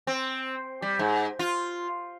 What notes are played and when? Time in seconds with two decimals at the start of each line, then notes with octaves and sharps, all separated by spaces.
0.07 C4
0.82 G3
0.99 G#2
1.39 F4